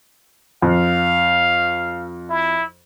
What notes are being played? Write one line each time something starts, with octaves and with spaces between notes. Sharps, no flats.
F2 F5
E4